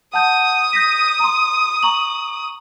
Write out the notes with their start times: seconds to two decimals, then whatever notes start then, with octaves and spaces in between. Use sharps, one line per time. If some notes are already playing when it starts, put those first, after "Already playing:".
0.14 F#5 A5 D#6 G6
0.73 G6 A#6 B6
1.20 A#5 C6
1.83 A#5 C#6 F#7